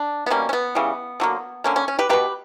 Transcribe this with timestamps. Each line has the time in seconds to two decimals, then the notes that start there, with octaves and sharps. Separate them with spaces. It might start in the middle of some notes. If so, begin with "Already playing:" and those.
Already playing: D4
0.26 B3
0.30 B2 G3 A#3 C#4
0.49 C#4
0.53 B3
0.75 C#3 E3 G3
1.20 D3 F#3 A#3
1.64 D3 A#3 C#4
1.76 C#4
1.88 C#4
1.99 G4 B4
2.09 B2 A#3 G4 B4